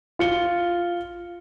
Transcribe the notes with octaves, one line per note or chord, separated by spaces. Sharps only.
F4 C#7 G7